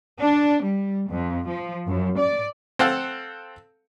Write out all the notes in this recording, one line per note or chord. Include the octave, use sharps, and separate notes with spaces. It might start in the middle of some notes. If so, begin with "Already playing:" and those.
D4
G3
F2
F3
F#2
D5
C4 A4 F5 F#5 A5